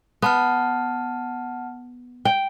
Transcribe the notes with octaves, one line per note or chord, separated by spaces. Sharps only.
B3 F#5 A5 F6
G5